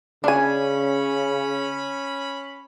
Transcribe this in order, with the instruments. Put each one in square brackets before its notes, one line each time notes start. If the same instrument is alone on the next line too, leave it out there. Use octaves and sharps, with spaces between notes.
[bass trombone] C#3 [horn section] C#4 B5 [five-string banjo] D4 G#5